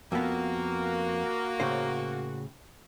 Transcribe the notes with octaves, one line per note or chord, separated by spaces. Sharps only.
F2 A#3 B3 F#4
A2 C#3 C5